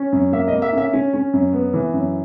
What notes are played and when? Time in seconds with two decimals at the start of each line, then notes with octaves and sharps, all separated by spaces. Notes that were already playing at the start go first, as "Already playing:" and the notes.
Already playing: C#4
0.12 F#2
0.32 A#3 E5
0.48 D#5
0.53 A#3
0.62 E5
0.73 C#4
0.78 E5
0.93 C#4
1.14 C#4
1.33 F#2
1.53 B3
1.74 E3
1.94 F#2